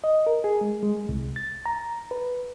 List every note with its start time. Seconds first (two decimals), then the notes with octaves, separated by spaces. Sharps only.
0.04 D#5
0.27 A#4
0.44 G#4
0.61 G#3
0.83 G#3
1.09 C2
1.36 A6
1.66 A#5
2.11 B4